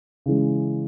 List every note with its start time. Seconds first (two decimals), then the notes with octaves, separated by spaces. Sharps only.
0.26 C#3 E3 G#3